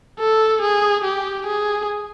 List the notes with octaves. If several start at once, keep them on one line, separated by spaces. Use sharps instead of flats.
A4
G#4
G4
G#4